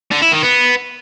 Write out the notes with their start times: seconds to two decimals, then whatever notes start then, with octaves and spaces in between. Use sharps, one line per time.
0.12 D3
0.22 E4
0.32 D#3
0.43 B3